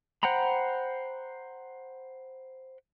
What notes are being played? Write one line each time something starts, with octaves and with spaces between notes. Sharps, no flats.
C5 F#5 G5 A#5 B5